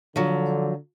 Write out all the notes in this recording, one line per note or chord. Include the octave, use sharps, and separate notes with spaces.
D3 F3 F#3